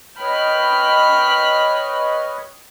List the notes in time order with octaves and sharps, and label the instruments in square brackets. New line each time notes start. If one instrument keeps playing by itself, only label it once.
[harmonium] B4 C#5 D#5 [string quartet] G5 B5 F6